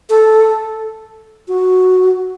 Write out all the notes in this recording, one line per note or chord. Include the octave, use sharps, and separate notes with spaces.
A4
F#4